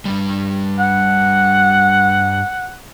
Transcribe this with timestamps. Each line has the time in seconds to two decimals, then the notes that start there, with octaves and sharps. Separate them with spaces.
0.05 G2 C3 G3
0.80 F#5